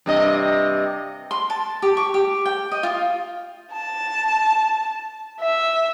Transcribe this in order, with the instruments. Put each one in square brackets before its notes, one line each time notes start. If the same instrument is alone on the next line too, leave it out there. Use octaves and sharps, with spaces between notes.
[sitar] G2 C3 D#5
[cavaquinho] C6
A5
G4
C#6
G4
G5
D#5
F4
[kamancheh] A5
E5